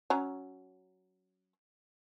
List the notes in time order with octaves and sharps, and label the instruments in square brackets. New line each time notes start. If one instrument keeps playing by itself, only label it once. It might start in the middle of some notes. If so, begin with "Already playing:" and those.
[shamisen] F#3 C#4 A#5